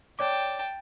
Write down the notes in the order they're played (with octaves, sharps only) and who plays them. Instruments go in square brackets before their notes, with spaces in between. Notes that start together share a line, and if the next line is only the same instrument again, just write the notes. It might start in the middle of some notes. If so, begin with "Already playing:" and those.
[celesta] C#5 D5 D6 [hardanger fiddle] G5 A5